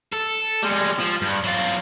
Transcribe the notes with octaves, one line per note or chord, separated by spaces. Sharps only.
A4
G3 G#3
F3
G2
F#3 F4